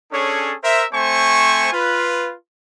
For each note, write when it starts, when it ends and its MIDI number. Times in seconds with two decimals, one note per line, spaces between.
0.12 0.54 61
0.12 0.54 62
0.12 0.54 68
0.12 0.54 69
0.12 0.54 73
0.63 0.86 70
0.63 0.86 72
0.63 0.86 76
0.93 1.70 57
0.93 1.70 60
0.93 1.70 72
0.93 1.70 80
0.93 1.70 85
1.73 2.33 65
1.73 2.33 71